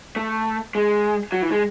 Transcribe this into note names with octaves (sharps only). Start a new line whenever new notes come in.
A3
G#3
F#3
E3
G#3